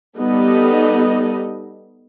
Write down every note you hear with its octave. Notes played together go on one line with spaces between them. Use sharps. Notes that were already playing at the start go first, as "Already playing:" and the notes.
G3 B3 D#4 G4 A4 D#5